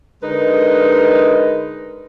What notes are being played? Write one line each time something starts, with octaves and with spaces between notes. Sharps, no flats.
D3 G#3 D#4 A#4 B4